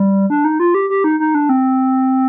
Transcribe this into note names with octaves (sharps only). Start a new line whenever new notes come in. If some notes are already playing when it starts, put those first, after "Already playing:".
Already playing: G3
D4
D#4
F4
G4
G4
D#4
D#4
D4
C4